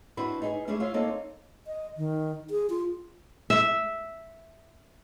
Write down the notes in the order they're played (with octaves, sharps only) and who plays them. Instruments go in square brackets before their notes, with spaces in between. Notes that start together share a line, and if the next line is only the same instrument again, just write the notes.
[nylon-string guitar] C4 D4 E4 F#4 B4
D#4 G#4 B4 D5 D#5
G3 A3 C#4 D4 E4 G#4
F4 C5 C#5 E5
A#3 C4 D#4 A4 C#5 D5
[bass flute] D#5
D#3
G#4
F4
[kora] E5